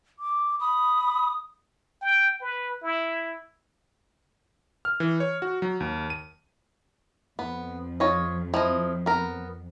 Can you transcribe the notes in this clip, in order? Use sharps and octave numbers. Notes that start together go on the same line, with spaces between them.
D6
B5 D#6
G5
B4
E4
F6
E3
C#5
F#4
F#3
D#2
D#7
F2 B3
F4 C#5 D#5
F3 E4 D#5
B3 A#4